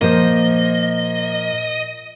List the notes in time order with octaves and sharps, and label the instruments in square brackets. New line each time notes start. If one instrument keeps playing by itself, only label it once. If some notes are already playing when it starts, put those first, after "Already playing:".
[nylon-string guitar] A#2 F3 C5 [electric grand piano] A#3 [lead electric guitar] D#5